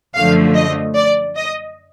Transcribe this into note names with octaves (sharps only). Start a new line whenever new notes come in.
F#2 D3 F3 A3 F5
D#5
D5
D#5